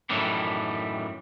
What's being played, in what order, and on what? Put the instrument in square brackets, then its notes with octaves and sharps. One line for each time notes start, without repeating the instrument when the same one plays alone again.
[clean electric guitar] F#2 A2 D#3 E3 G3